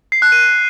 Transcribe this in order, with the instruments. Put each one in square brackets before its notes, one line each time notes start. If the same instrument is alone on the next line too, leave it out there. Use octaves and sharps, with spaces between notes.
[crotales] C7
F#6
D#7